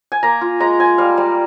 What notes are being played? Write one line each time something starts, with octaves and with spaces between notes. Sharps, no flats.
G#5
A#3 A#5
F4
G#3 A#5
G#3 G#5
G3 F5
G3